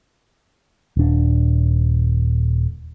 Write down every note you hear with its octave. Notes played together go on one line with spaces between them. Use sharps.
D#1 D4